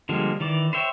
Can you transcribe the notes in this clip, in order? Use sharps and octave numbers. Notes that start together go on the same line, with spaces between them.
D3 F3 G3 G#3 A#3
D#3 E3 D5 D6
C5 C#5 E5 G5